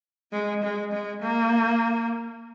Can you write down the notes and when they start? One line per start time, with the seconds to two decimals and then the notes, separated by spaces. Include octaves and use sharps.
0.32 G#3
0.63 G#3
0.92 G#3
1.22 A#3